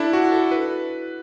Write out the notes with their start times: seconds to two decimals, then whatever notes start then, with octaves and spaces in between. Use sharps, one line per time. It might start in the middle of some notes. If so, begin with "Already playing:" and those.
Already playing: D4 E4 A4
0.13 F#4
0.32 A4
0.51 B4